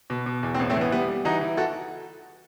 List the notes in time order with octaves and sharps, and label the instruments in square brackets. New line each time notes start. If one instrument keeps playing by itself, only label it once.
[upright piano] B2
B2
E2
C4
A1 B3
A3 C4
E3
B3
G3 B3
G3
E3 D#4 F#4
E3
F#4 A4